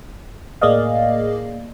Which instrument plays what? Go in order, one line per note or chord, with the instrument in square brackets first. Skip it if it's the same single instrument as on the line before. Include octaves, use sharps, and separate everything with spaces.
[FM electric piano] A2 A#3 G#4 D5 D#5 F5